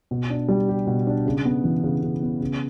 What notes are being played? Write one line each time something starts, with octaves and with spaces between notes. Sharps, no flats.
B2
D4
G3
G4
B2
D4
C#3
B3
E3
C#3
C#3
B3
C#3